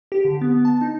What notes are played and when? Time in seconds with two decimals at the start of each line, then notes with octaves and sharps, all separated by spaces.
0.12 G4
0.25 D3
0.41 B3
0.65 A5
0.81 D#4